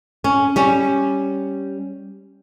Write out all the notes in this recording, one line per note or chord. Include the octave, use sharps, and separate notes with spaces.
C#4
G3 C#4